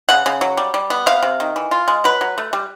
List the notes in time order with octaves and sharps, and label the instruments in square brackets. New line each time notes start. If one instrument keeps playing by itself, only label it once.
[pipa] C#3 F#5
C#3
F#3
G3
G3
B3
C3 F5
C3
D#3
E3
F4
G#3
F#3 B4
F#3
A3
G3